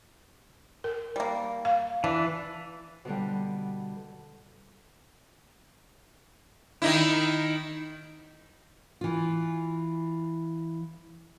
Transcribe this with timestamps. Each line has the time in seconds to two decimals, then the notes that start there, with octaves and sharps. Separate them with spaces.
0.84 A#4
1.16 G3 A#3
1.65 F5
2.04 E3 D4
3.05 B2 D3 G3
6.82 D#3 D#4 E4
9.01 E3 F4